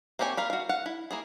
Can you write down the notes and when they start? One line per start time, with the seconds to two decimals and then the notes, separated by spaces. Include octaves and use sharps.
0.19 A#3 C4 G4 C#5 G#5
0.37 A#4 F5 B5
0.50 F#4 F5
0.69 F5 F#5
0.86 E4
1.11 A#3 E4 G#4